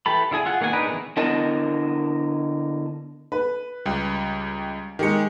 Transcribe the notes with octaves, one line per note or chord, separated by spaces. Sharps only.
E3 G4 A4 B5
D3 E4 G#4 G#5
F4 G#4 F#5
D#3 A#3 B3 F#5 G#5
D4 D#4 G#4 A#4 B4
D#3 E3 G3 B3 G#4
D3 B3 E4 A#4 D#5 A5
B4
C#2 G3
D#3 G#3 G4 C#7